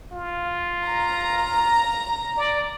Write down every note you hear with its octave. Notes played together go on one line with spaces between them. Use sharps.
F4
A#5
D5